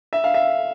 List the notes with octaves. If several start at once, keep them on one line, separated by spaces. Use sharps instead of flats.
E5
F5
E5